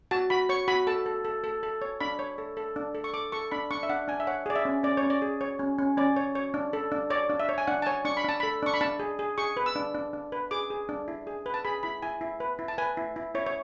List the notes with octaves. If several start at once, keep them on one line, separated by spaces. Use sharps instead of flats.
F#4 A5
F#4 B5
C#5 C#6
F#4 B5
A4 A5
A4
A4
A4
A4
C#5
D4 B5
C#5
A4
A4
D4
A4
C#6
A4 D6
A4 C#6
D4 B5
D4 C#6
E5
D4 F#5
D4 G#5
E5
C#5 F#5
G#4 D5
E5
C#4
C#4 D5
C#5
C#4
D5
G#4
C#5
C#4
C#4
C#4 D5
C#5
C#5
D4
A4
D4
C#5 D5
D4
E5
C#5
G#5
D4 F#5
A5
C#5 G#5
D4 C#6
B5
D4 A5
A4 B5
D4 C#6
B5
D4 A5
G#4
G#4
G#4 C#6
B4
E6
D4
D4
D4
B4
G#4 D6
G#4
D4
E4
G#4
B4
A5
G#4 B5
E4 B5
E4 G#5
E4
B4
E4
A5
B4 G#5
E4
E4
E4 C#5
C#5